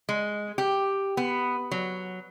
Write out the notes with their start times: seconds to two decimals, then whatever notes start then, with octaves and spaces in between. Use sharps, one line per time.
0.09 G#3
0.58 G4
1.17 B3
1.71 F#3